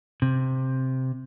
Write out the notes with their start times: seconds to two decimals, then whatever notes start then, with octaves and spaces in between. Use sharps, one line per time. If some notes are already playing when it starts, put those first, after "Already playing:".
0.22 C3